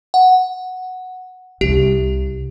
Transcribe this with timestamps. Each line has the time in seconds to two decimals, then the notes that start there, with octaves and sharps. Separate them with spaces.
0.14 F#5
1.61 C2 G4